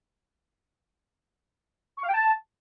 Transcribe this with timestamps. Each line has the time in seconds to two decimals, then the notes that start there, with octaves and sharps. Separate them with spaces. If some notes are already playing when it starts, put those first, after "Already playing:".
1.97 C#6
2.02 F5
2.08 G5
2.13 A5